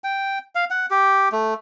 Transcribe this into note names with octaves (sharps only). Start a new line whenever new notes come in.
G5
F5
F#5
G4
A3